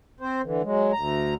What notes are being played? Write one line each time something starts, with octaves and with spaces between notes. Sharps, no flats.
C4 C5
D3 E3
F#3 G#3
D2 A#5